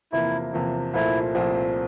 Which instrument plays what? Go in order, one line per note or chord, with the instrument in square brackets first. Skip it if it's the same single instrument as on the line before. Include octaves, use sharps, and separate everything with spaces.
[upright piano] E2 C3 F3 A#3 [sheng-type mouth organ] E4
[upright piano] E2 C3 F3 A#3
[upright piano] C2 A#2 F3 A3 C4 [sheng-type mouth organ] E4
[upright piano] C2 A#2 F3 A3 C4